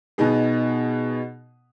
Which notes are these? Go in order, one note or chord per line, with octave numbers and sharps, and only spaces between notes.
B2 B3 D#4 G#4